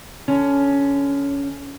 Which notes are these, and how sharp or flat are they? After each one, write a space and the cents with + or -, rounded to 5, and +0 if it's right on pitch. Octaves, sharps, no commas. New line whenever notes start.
D3 +0 C#4 +15